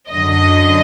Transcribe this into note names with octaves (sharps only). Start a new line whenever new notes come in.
F#2 D3 F#3 D#5